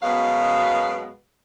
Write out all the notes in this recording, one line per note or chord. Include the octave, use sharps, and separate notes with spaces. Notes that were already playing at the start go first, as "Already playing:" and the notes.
F#2 B2 G#3 B3 B4 F5